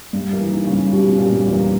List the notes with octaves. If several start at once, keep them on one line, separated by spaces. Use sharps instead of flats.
G2 G3
A#3
E3
D#4
C#3
G2
B2 G3
G3
A#2
G2
E2
A#3